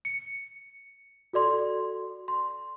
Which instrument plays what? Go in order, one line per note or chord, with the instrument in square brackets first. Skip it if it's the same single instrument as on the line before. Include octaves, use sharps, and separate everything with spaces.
[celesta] C#7
F#4 A4 D5 C6
C6